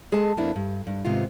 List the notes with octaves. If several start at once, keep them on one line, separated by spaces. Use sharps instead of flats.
G#3 G#4 A4 D#5 A5
F2 A#3 B3 D4 E4
G2
G2
G#2 C3 D#3 B3 F4